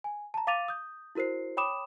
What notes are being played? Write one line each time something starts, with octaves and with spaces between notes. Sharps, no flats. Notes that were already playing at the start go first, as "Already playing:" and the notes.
G#5
A5 A#5
F5 D6 A6 D#7 F7
D#6 G6
E4 F#4 A#4 C5 C7
C#5 G5 B5 D6 D#6 E7